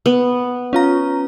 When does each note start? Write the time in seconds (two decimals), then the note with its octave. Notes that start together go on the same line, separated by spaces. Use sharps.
0.06 B3
0.73 C#4 F4 A#5